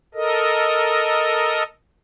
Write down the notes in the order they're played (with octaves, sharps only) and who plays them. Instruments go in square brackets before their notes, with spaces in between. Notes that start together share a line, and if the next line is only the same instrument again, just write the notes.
[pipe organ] A4 A#4 D#5